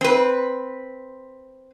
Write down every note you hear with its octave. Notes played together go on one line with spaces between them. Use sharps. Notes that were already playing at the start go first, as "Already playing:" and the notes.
C4 B4